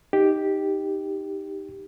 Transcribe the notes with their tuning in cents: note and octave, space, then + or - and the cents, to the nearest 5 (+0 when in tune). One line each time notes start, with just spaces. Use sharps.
D#4 +0 G4 +0